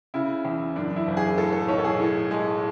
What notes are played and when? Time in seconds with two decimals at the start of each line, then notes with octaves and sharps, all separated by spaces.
0.14 C#3 E4
0.45 E2
0.76 F#2 D4
0.96 E4
1.07 F#1
1.17 G#4
1.38 A2 A4
1.53 A4
1.68 B1 C#5
1.78 A4
1.84 G#4
2.00 A2
2.31 G#3